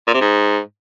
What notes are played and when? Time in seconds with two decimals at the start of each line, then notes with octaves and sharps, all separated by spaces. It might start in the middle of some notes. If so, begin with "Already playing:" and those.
0.07 A#2
0.14 C3
0.21 G#2